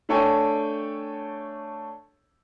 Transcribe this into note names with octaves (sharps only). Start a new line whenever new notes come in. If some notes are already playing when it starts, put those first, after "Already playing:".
A3 D4 A4 C#5 G5 G#5